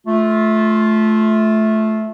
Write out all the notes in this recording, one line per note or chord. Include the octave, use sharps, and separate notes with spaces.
A3 F4